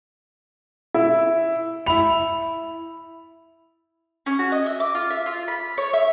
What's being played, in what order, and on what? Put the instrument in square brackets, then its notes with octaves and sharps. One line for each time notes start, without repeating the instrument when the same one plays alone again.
[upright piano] E4
[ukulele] E4 B5 [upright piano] F7
[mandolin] C#4
F#4
D#5
E5
D6
F4
E5
F4
B5
C#5
E5